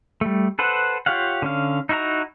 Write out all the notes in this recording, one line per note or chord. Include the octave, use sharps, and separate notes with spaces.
G3 A3
A4 B4 C5 F#5
F4 G4 C#5 F5 F#5
D3 C#4 F5
D#4 E4 F#4 E5 A#5